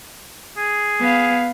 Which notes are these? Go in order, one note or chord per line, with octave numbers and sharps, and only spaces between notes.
G#4
B3 F5